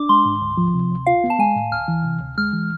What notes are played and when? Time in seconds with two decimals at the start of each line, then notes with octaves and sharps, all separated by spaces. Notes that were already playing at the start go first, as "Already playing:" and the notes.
Already playing: D4 D6
0.09 G#3 C6
0.25 G#2
0.42 D2
0.57 F3
0.74 C3
0.91 D2
1.06 F4 F5
1.24 B3
1.30 A5
1.39 G#3 G#5
1.56 A2
1.71 D2 F6
1.88 E3
2.04 C3
2.21 D2
2.38 G#3 F6
2.53 E3